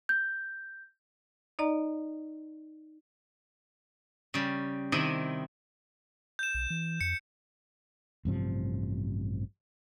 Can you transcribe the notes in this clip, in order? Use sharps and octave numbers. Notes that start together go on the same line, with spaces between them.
G6
D#4 D5 D#5 A#5
C#3 G3
C3 D#3 E4 D#5
G6 E7
B1
E3
F2 C#7
A1 G2 C3 F3